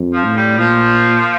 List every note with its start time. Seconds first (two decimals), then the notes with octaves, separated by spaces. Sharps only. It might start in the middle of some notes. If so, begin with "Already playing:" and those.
Already playing: F2
0.13 F3
0.25 A2
0.36 G3
0.58 A#2 F3